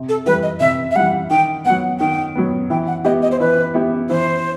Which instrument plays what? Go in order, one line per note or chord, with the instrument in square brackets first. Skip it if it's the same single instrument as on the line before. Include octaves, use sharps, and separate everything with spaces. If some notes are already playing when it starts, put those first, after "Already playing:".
Already playing: [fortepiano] C3
[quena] A4
[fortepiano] E3 G3 [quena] B4
[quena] D#5
[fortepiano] C3 [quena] E5
[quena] E5
[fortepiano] E3 G3 [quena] F#5
[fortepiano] D#3 [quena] G5
[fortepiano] F#3 B3 [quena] F#5
[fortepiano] D#3 [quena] G5
[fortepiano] F#3 B3
[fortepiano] E3 [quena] G5
[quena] F#5
[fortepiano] B3 E4 G4 [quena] D#5
[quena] D#5
C5
[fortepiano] E3 [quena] B4
[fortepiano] B3 E4 G4
[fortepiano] E3 [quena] C5